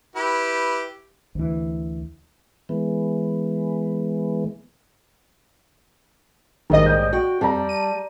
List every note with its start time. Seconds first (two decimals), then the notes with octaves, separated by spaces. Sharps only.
0.15 E4 G4 B4
1.35 D2 E3
2.69 E3 G#3 B3
6.70 A#1 D#2 G#2 D#3 G3 D#5
6.86 G6
7.13 F#4 G5
7.41 F2 G3 A5 A#5
7.69 D#7